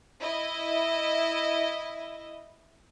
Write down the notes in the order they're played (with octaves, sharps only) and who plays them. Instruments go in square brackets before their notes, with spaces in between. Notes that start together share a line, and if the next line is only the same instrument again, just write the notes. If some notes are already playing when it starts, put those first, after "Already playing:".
[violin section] E4 D#5